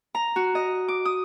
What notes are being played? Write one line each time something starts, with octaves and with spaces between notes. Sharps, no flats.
A#5
F#4
D#5
D6
D#6